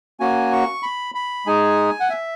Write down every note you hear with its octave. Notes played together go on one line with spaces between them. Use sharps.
A#3 C#4 F#4 G#5
C#6
B5
B5
G#3 D#4 G#4 G#5
F#5
E5